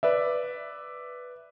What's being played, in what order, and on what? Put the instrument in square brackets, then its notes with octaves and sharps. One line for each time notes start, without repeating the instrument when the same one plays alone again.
[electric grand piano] B4 D5 E5